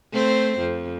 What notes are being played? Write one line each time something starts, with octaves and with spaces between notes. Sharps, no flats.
A3 C4 C5
F2